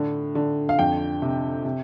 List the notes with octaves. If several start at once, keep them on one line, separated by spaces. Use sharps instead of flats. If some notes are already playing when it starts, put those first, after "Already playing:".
Already playing: A2 D3
D3
F5
F2 G5
C3
C3